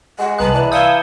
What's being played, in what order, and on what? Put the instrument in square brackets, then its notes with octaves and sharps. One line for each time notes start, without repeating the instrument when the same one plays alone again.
[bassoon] G#3 [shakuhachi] F#5
[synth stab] C2 F#6 [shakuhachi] B4 [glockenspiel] A5 A#5 D#6
[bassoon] E3 [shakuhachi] D5
[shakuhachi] F5 [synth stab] D#6 E6 G#6 [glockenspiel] G6 C#7 G7